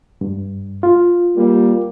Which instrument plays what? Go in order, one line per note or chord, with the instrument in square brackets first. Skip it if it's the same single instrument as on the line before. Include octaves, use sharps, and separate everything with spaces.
[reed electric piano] G2
F4
[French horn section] G3 A#3